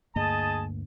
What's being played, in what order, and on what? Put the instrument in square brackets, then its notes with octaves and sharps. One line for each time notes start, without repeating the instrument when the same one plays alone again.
[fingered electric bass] D2 G2 A#3 [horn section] G#4 D#5 A5